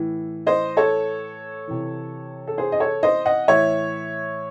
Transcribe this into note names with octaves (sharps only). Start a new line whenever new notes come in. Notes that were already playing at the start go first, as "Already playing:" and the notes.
Already playing: A2 E3
C5 D#5
A4 C#5
C3 E3
A4
G#4 C5
D#5
A4 C#5
C5 D#5
D#5 F#5
A2 E3 C#5 E5